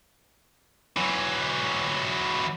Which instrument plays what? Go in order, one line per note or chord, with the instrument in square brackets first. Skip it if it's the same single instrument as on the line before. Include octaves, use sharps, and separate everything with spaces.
[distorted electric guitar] E3 F#3